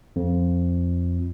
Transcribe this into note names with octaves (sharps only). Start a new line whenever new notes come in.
F2